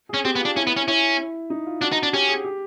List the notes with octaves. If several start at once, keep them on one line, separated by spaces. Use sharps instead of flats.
C#4 G#4
C4 G4
B3
F4
D4
C#4 E4
B3
C#4
C#4 E4
D#4
F4
D4 F#4
D#4
D4
C#4 G4
G#4
G4